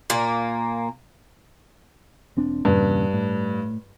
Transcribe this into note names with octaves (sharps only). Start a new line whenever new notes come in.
A#2 A#3
E1 C4 D4
E2 G2 A#2 C#3
A2